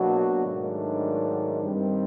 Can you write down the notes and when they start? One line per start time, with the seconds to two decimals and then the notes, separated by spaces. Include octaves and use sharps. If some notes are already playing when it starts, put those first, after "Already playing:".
Already playing: B2 F#3 A#3 D4 F#4
0.44 G#2 D#3 F#3 A3 D4
1.61 G2 D#3 G3 C4